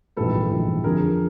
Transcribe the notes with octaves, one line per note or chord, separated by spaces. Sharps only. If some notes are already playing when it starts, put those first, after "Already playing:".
A#1 G#2 E3 G3 A4 B4
A#1 G#2 E3 G3
F2 D3 F3 G#4 A#4